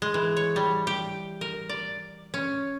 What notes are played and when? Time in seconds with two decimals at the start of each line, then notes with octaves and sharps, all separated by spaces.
0.02 G#3
0.14 E3
0.37 C#5
0.56 G3
0.87 G4
1.41 A#4
1.69 D5
2.34 C#4